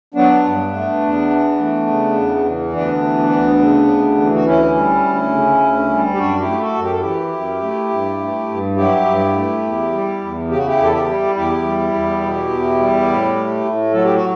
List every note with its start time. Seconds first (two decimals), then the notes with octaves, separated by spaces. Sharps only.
0.14 F#3 B3 D4
0.44 G2
0.73 A3
1.01 E2
1.30 E3
1.58 A3
1.87 C#3
2.15 E2
2.45 E3
2.73 D2 B3 D4
3.01 E3
3.30 D2
3.59 C#3
3.88 D2
4.17 E3
4.34 F#4
4.46 D2 C#4 E4
4.74 G3
5.03 D2
5.32 C#3
5.61 D2
5.89 G3
6.14 G4
6.18 F#2 D4 F#4
6.39 E4 G4
6.47 A3
6.60 F#4 A4
6.75 F#2
6.83 G4
6.92 A4
7.00 E3 E4 G4
7.32 F#2
7.61 A3
7.90 G2
8.18 A3
8.48 G2
8.76 F#3 E4 G4
9.06 G2
9.33 A3
9.62 E2
9.91 G3
10.20 E2
10.48 C#3 G4
10.57 F#4
10.66 E4 G4
10.77 E2
10.84 A4
10.92 E4 G4
11.06 G3
11.35 E2 E4 G4
11.63 G3
11.93 E2
12.21 B2
12.49 E2
12.79 G3
13.07 A2
13.36 A3
13.64 A2
13.93 F#3 A4
14.04 G4
14.15 F#4